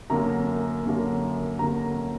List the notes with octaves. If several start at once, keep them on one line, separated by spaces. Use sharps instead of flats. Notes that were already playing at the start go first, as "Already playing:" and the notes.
F#2 D3 A#3 A#5
F#2 D3 A#3
F#2 D3 A#3 A#5